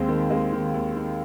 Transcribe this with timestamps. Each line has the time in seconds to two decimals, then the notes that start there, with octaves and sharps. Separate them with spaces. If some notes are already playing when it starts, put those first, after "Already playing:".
Already playing: D#2 G#3 C4
0.08 D#3
0.30 D#2 G#3 C4
0.53 D#3
0.74 D#2
0.96 D#3